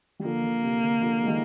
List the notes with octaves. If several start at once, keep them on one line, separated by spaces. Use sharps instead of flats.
G3
D3 F3 A#3
D3
C3
D3
D3 F3
G#3
D#3 G3